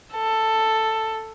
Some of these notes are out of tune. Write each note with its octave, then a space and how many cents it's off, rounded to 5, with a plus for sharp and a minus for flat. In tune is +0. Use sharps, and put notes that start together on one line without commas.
A4 +10